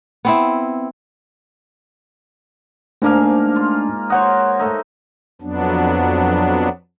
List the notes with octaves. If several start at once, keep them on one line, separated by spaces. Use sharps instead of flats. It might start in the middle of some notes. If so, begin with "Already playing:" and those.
B3 C4 E4
G#2 A3 A#3 D4 F5 A5
F4
F#4 C5 C#5 F#5 D#6
A3 D#4
F2 F#3 B3 D4